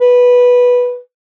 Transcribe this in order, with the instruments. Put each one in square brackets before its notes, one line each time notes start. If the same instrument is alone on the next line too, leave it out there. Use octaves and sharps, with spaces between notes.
[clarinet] B4